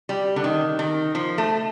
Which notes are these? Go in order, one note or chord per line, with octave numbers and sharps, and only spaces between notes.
G3
D3
D#3
D#3
F3
A3